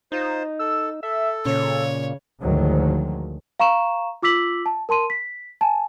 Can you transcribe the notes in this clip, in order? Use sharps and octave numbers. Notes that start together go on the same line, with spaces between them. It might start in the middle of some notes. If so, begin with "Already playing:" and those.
D#4 F4 C5
A4 E6
A4 E5
A#2 C#3 C#5
D2 G#2 D#3 F3 F#3 G#3
F5 A#5 C#6 E7
F4 D6 E6 B6 F#7
A5
A#4 A5 C6 D#7
B6
G#5 A5